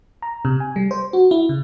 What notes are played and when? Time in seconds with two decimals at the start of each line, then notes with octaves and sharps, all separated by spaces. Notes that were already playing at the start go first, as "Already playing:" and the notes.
0.22 A#5
0.45 C3
0.60 G#5
0.76 G3
0.91 C5
1.13 F#4
1.31 E4
1.49 C#3